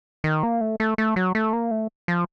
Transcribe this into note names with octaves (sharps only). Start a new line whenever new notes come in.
D#3
A#3
A3
A3
A3
F#3
A3
A#3
A3
F3